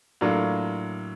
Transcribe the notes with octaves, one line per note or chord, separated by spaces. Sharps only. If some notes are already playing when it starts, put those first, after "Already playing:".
A2 F#3 A#3 D4 F4